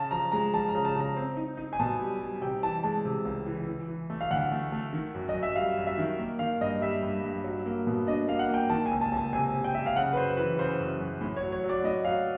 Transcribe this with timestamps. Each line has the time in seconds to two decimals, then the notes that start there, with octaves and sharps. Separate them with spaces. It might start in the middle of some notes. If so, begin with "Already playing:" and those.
Already playing: C#3 A5
0.11 F3 A#5
0.32 G#3 A#5
0.54 F3 A5
0.69 A#5
0.75 C#3
0.85 A5
0.95 C#3 A#5
1.16 C4
1.37 D#4
1.57 D#4
1.73 G#5
1.79 B2 A5
2.00 G3
2.21 G3
2.41 C3 G5
2.63 E3 A5
2.83 G#3 A5
3.05 C3
3.25 C#2
3.46 E3
3.67 E3
3.88 E3
4.10 A3
4.21 F5
4.31 D2 F#5
4.52 A3
4.72 A3
4.93 D#3
5.15 F#2
5.29 D#5
5.34 F#2
5.43 E5
5.55 G3 F5
5.77 F#2
5.87 E5
5.98 D#3
6.19 A#3
6.39 D#3 F5
6.61 G2 D#5
6.81 G3 E5
7.02 G2
7.23 G2
7.44 F#3
7.66 A#3
7.87 B2
8.07 D4 D#5
8.28 A#3 F5
8.39 F#5
8.49 A#3 G5
8.70 D#3 A5
8.86 G#5
8.91 C#2
9.01 A5
9.12 C#2 A5
9.33 C3 G#5
9.54 C3
9.64 G5
9.75 C3 E5
9.86 F5
9.96 C#3 F#5
10.13 B4
10.16 F#2 C5
10.37 E3 B4
10.58 C#3 C5
10.80 F#2
11.00 F#2
11.21 A2
11.36 C#5
11.43 F#3
11.52 C#5
11.64 F#3
11.69 D5
11.84 A2 D#5
12.05 F#3 F5